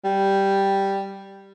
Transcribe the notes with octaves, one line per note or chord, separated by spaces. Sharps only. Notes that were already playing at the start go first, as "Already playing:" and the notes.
G3